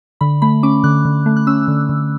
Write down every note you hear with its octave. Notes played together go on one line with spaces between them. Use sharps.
D3 B5
A3 B5
C#4 D6
D3 F#6
D3
A3
F#6
C#4 E6
D3
D3